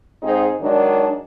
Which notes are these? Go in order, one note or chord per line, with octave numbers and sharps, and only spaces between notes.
G#2 C4 D#4 G#4
D#3 F#3 G#3 D4